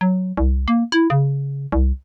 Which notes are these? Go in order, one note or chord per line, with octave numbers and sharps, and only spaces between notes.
F#3
C2
A#3
E4
C#3
C2